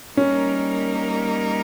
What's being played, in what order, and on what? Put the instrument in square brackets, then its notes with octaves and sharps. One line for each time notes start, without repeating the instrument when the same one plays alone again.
[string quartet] G3 A#3 D#4 A#4 [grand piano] C#4